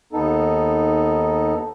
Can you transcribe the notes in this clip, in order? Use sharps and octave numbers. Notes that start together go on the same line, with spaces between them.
D#2 B3 D#4 A4